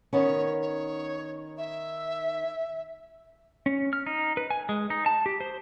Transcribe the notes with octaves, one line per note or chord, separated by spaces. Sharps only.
D#3 B3 C#4 C#5
C#5
E5
C#4
F6
D#4
B4
G#5
G#3
D#4
A5
G4
C5